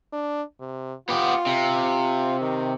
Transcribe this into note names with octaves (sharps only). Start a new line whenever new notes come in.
D4
C3
B3 F4 G4
C3
D#3